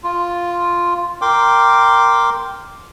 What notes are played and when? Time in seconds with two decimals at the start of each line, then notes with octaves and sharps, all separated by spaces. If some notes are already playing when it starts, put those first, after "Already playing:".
0.03 F4
1.21 A#4 G5 C6 D6